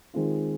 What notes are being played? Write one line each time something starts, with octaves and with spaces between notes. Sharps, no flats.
D#3 G#3 C4 F4